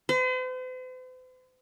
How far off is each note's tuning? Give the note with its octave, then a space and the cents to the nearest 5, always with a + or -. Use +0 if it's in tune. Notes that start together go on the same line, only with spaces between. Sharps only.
C5 -45